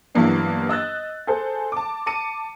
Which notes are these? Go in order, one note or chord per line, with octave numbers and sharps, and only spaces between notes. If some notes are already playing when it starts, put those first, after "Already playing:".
G2 E3 F#3 A#3 B3 D4
D#5 E6 F#6 A6
G#4 A4 C5
A5 D6
A5 D6 C#7 D#7